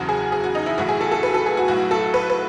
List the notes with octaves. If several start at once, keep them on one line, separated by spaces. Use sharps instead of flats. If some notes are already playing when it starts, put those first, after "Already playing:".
Already playing: F#1 E2 C#3 F#3 F#4
G#4
G#4
F#4
D#4
E4
B1 A2 E3 F#4
G#4
A4
A4
B4
A4
G#4
F#4
B1 A2 F#3 F#4
A4
B4
B4